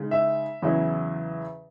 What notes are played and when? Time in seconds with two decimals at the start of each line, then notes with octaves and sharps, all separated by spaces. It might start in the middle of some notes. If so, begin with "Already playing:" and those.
Already playing: C#3 G#3 D#4
0.11 E5
0.62 E2 C#3 F#3 C#4 E4